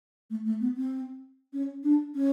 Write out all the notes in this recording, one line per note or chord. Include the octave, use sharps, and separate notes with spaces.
A3
A3
B3
C4
C#4
D4
C#4